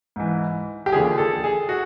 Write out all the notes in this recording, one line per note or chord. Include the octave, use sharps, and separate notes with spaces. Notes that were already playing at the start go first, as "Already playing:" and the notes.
G#2 E3
G4
D#2 D3 F3 G#4
A4
G#4
F#4